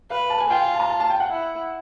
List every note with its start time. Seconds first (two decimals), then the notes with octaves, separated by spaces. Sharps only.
0.10 B4 F5
0.30 A5
0.40 G#5
0.49 F4 G5
0.60 G#5
0.75 A5
0.80 A#5
0.90 A5
1.00 A5
1.10 G5
1.20 F#5
1.29 E4